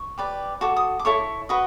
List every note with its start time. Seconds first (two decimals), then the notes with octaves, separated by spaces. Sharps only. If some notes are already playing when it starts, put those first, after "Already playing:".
Already playing: C#6
0.18 G4 B4 D5
0.61 F#4 A4 D6
0.77 D#6
0.99 D6
1.05 E4 A4 C#5 C#6
1.49 F#4 B4 D#5